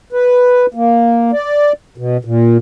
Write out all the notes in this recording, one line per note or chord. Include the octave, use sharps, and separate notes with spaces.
B4
A#3
D5
B2
A#2